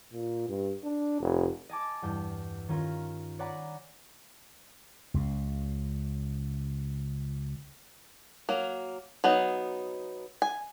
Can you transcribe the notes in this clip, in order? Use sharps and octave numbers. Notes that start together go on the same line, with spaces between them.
A#2
G2
D4
F1
D#5 G#5 A5 D6
E2 G2 G6
D#3 C#4 F4 A#4
C#5 D5 F#5 G#5 A#5 B5
C#2 C#3
F#3 A#3
F#3 B3 D#4
G#5